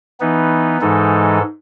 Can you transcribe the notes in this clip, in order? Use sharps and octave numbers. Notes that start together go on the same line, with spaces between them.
E3 B3 D#4
G#2 E3 G#3 D#4 A4